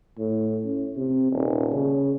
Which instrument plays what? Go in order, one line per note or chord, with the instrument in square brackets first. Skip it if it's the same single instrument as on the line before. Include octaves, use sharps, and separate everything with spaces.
[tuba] A2
C#4
C3
D#1
C#3